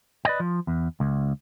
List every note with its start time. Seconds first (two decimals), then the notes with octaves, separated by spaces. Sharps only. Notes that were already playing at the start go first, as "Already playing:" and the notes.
0.25 B4 D5 D#5 G5
0.40 F3
0.67 E2
1.00 C#2